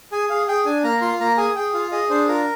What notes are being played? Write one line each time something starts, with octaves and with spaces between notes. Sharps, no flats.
G#4 G#5
G#4 F5
G#4 G5
D4 G#5
A#3 A#5
F4 C6
A#3 A#5
G#4 G#5
G#4 G5
F4 F5
G#4 D#5
D4 C5
F4 A#4